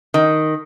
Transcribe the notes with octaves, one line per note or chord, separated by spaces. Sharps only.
D#3